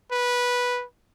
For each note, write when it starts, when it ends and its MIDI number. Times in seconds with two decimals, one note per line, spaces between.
0.11 0.84 71